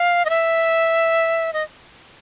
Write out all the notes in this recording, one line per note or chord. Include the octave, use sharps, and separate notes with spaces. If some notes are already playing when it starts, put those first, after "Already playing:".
Already playing: F5
D#5
E5
D#5